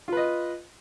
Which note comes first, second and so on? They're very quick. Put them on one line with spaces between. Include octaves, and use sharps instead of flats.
F4 B4 D#5